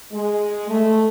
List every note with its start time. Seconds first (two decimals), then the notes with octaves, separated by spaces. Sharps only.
0.12 G#3
0.69 A3